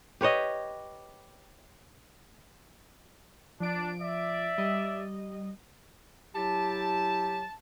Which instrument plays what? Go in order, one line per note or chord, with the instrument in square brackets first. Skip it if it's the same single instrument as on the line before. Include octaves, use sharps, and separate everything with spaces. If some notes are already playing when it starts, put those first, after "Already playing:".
[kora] G4 B4 C#5 D#5
[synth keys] F3 D7 [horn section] D4
[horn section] D5 E5
[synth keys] G3 D#5
[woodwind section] F#3 E4 G4 [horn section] A5